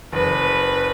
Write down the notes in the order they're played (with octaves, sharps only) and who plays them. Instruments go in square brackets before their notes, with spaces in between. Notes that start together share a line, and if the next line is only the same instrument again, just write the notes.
[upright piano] F#1 [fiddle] B4